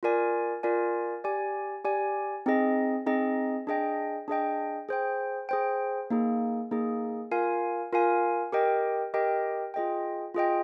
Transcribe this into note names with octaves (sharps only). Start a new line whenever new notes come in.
F4 A#4 D5 G#5
F4 A#4 D5 G#5
G4 D5 G#5
G4 D5 G#5
C4 D#4 G#4 D#5
C4 D#4 G#4 D#5
D4 G#4 D#5 G5
D4 G#4 D#5 G5
G#4 C5 G5
G#4 C5 G5
A#3 D#4 G#4
A#3 D#4 G#4
F4 A#4 F5 G#5
F4 A#4 F5 G#5
G4 A#4 D#5 G5
G4 A#4 D#5 G5
F4 G#4 D#5 G5
F4 G#4 D#5 G5